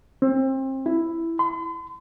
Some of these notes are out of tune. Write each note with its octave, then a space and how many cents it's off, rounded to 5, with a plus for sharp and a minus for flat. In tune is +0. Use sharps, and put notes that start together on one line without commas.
C4 +30
E4 +5
C6 -45